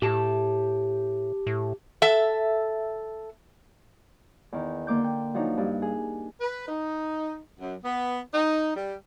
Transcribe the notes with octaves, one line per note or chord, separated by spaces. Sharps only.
A2 G4 A5
A2
A4 E5
E2 D#3
D3 A#3 D6 G6
G5
F3 F#3 D4 D#4
G2
G#4
B4
D#4
F#2
B3
D#4
G3